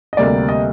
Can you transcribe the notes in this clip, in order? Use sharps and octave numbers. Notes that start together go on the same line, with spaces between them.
D#5
D2 C3 G3 A#3 D5
D#5